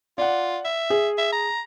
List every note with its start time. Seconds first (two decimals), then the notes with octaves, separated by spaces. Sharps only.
0.18 F4 D5 F#5
0.65 E5
0.90 G#4
1.18 E5
1.32 A#5